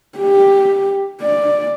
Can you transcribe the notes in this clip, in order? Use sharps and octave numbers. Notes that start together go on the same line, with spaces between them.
G4
D5